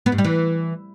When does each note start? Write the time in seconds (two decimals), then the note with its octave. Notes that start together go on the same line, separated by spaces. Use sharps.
0.06 B3
0.12 G2
0.18 G3
0.25 E3